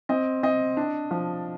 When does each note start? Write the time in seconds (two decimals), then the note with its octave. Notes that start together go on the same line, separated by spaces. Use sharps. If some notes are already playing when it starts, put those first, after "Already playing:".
0.09 C4 D#5
0.43 C4 D#5
0.77 D4
1.11 F3